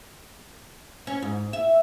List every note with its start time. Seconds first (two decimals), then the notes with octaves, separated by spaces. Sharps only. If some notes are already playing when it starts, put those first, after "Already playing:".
1.07 C#4
1.22 G#2
1.53 E5